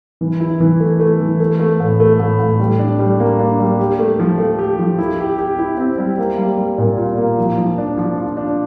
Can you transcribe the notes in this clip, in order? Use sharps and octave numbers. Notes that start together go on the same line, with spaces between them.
E3
E4
E3
A3
A3
E3
A3
A3
A2
A3
A2
A2
G3
D4
G3
A#3
D4
G3
G4
A3
F3
A3
G4
F3
E4
G4
G4
E4
C4
G3
A#3
G3
G3
A#2
F4
A#3
F3
F3
D4
F3
F4
D4